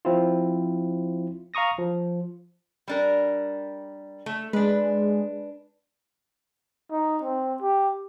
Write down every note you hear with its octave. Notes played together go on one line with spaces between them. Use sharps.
F3 C4 E4 F4
F5 A#5 C#6 D#6 A#6
F3
G3 D4 A#4
A3
G#3 D4 B4
D#4
C4
G4